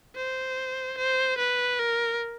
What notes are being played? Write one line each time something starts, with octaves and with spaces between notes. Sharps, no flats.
C5
C5
B4
A#4